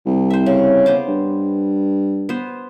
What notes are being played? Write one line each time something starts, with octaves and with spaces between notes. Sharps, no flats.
C2
C5 E5
C#3
B3 C5 D6
G2
B3 C5